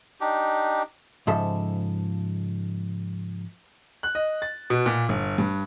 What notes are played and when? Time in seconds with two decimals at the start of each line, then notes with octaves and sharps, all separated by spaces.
0.21 D4 D#4 G4
1.27 G#2 C#3 F3 A4 E5
4.03 F#6
4.15 D#5
4.42 A6
4.70 B2
4.86 A#2
5.09 G1
5.38 G2